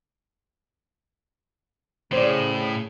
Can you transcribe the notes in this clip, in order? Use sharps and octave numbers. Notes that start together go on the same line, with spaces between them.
A2 C#3 C5 D5